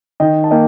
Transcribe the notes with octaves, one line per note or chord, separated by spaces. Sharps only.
D#3 D#5 G5
A5
A#3 D#5 G5